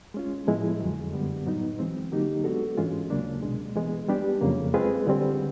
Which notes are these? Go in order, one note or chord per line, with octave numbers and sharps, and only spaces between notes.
G#3 C#4 F4
A2 F3 G#3 B3 E4
F2 D3 F#3
F#2 D3 G3 B3
A2 F#3 B3 D#4
E3 G#3 C4
D3 F#3 A#3 D#4 G4
G#3 B3 D4 F#4 A4
G#2 E3 G#3 C#4 F4
D#2 C#3 F#3 A#3 D4
C2 B2 G#3
E3 G#3 B3
G3 B3 D4 G4
F2 C#3 F#3 A#3
G#3 C4 F4 G#4 B4
D3 G3 C4